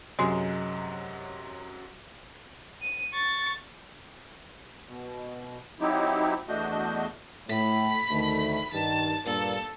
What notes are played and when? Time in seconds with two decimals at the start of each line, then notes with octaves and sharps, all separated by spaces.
0.19 F#2 C3 F#3 G#3
2.81 D#7
3.13 C#6 A6
4.87 B2
5.80 F#3 C4 D#4 E4 G4
6.48 E2 A3 D4 F#4 D#5 G6
7.49 A2 B5 B6
8.10 D2 D#3 A3
8.73 G2 D#3 A5
9.26 G2 A#2 A#3 A4